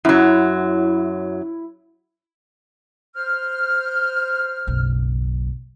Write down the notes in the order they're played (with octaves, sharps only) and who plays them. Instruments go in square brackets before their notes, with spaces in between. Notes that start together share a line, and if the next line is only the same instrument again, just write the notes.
[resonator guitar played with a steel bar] F#2 F#3 [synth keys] E4
[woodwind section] C5 F6
[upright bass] F#1 B1